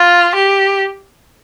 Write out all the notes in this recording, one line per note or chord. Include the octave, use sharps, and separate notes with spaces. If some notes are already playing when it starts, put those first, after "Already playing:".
Already playing: F4
G4